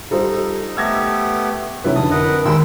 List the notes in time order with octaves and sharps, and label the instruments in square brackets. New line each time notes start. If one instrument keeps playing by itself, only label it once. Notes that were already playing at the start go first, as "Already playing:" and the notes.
[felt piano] G3 F4 C5 [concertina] D#4 [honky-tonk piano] A4
[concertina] A3 B3 G4 [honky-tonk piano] E6 G#6 A#6
[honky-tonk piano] C3 F#3 [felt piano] C#4 E4 B4
[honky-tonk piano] F2 D3 [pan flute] D#4 [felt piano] A5 [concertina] D#6
[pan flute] A#4 [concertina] B4 D#5 F#5
[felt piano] D#2 B5 [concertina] G#3 G5 E6